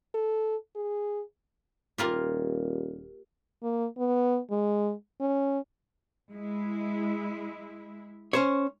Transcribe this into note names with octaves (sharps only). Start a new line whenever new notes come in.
A4
G#4
D#1 A#3 F4 G4
A#3
B3
G#3
C#4
G#3 E4
C#4 C5 C#5